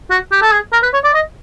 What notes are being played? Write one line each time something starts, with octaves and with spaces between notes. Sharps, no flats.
F#4
G4
A4
G#4
A#4
B4
C#5
D5
D#5